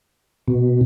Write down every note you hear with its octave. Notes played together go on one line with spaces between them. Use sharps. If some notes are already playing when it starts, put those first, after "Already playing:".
B2